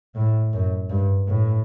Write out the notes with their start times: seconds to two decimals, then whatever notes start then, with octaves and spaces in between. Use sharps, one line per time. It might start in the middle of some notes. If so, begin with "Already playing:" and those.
0.15 A2
0.53 F#2
0.90 G2
1.28 A2